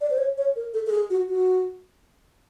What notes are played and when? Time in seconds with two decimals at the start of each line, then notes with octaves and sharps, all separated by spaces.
0.01 D5
0.10 C5
0.18 C#5
0.38 C#5
0.56 A#4
0.74 A4
0.87 A4
0.92 G#4
1.10 F#4
1.29 F#4